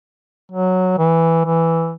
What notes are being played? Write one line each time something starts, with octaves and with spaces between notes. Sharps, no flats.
F#3
E3
E3